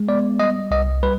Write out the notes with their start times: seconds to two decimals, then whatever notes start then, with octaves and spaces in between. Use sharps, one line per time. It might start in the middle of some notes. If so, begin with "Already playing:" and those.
Already playing: G#3
0.08 B3 D5
0.40 G3 D#5
0.71 C2 D#5
1.03 G3 B4